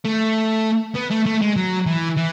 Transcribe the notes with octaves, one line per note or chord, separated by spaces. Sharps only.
A3
B3
A3
A3
G#3
F#3
E3
E3